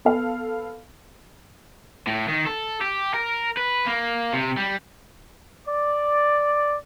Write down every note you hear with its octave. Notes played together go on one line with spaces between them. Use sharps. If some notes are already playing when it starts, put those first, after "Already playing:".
B3 A4 F5
A2
D#3
A4
G4
A#4
B4
A#3
C3
G3
D5